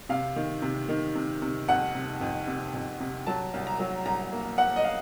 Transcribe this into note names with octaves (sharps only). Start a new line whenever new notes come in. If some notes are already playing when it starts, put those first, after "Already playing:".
C3 F5
D#3
C3
D#3
C3
C3
F2 F#5
C3
F2
C3
F2
C3
F#3 A5
C2
A#5
F#3
C2 A#5
A#3
A#3 F#5
D#5
F5